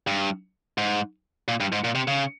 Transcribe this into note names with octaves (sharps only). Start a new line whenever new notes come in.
G2
G#2
A#2
G2
G#2
A#2
C3
C#3